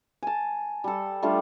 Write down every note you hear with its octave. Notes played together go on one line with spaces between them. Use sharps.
G#5 A5
G3 A4
G3 A3 D4 F4